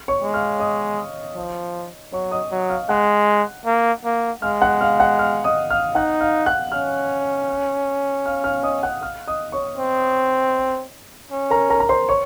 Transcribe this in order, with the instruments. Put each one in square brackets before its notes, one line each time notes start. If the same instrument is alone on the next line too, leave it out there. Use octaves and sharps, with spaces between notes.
[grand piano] C#5 C#6
[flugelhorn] G#3
[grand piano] F5 F6
D#5 D#6
[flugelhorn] F3
[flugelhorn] F#3 [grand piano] C#5 C#6
[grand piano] D#5 D#6
[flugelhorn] F#3
[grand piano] F5 F6
[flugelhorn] G#3 [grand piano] F#5 F#6
[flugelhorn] A#3
A#3
[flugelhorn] G#3 [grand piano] F5 F6
[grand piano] F#5 F#6
F5 F6
F#5 F#6
F5 F6
D#5 D#6
F5 F6
[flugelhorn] D#4 [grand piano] F#5 F#6
[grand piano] F5 F6
F#5 F#6
[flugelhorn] C#4 [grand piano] F5 F6
[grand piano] F5 F6
F5 F6
D#5 D#6
F#5 F#6
F5 F6
D#5 D#6
C#5 C#6
[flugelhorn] C4
C#4
[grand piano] A#4 A#5
A#4 A#5
A#5
C5 C6
C#5 C#6